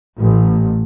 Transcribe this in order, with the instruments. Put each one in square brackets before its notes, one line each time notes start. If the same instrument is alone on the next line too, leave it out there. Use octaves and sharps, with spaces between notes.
[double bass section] A1